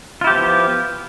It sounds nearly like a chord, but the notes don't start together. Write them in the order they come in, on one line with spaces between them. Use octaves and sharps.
F4 E4 G4 F3 B3